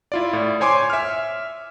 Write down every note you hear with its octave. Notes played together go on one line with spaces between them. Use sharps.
E4 F4 D5
A2
C5 C#5 G#5 C6 D6
E5 F6